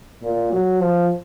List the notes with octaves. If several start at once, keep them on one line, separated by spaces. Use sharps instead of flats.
A#2
F#3
F3